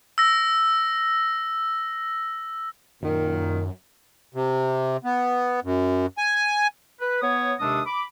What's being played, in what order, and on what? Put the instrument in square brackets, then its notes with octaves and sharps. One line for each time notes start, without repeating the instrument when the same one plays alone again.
[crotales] E6 A#6
[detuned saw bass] F#2 [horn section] A#2 D#3
[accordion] C3
B3
F#2
G#5
[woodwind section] B4
B3 C#5 D#6
D#2 C3 G#3 D4 A4 D#6
B5 D6